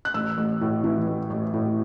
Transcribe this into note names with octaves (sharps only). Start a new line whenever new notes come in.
F#6
A1 E6
A1
A2
E3
A1
A1
A2